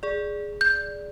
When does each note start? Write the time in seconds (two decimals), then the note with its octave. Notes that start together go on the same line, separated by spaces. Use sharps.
0.03 G#4 D5
0.61 G6